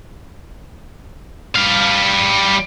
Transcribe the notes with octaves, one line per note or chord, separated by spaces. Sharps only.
G3 F5